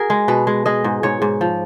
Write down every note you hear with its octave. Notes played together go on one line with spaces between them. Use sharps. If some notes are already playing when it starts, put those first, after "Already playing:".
Already playing: F#4 G#4 A#4
G#3
B2 B4
G#3
G#3 D#5
G#2
G#2 C#5
G#2
F3